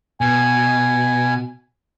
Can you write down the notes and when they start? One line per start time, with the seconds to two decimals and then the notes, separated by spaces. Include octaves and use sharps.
0.21 B2 G#5